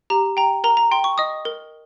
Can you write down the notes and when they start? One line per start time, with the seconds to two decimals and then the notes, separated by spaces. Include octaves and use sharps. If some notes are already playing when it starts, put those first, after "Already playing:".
0.10 G4 A#5
0.37 G5 A#5
0.64 A#4 A#5
0.77 A#5
0.91 G5 C6
1.04 C#6
1.18 D#5 D#6
1.45 A#4